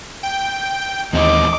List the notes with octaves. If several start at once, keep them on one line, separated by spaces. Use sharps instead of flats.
G5
D#2 E3 C4 D#4 D#5 D6